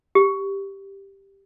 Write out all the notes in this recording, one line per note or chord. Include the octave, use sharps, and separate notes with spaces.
G4